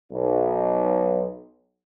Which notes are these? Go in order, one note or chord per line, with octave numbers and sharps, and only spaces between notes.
B1 D#4